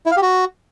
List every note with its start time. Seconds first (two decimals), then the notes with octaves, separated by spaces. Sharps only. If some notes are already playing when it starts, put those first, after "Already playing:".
0.06 E4
0.11 F5
0.17 G4
0.22 F#4